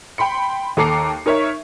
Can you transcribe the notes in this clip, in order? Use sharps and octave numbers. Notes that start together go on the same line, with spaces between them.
G5 B5 C6 C#7
D#2 A4 A#5 D6 C7 C#7
D#4 A#4 C#5 E5 C#6